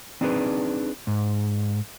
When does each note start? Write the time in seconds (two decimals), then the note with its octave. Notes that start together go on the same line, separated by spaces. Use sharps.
0.21 C4 D4 D#4 G#4 A4 B4
1.07 G#2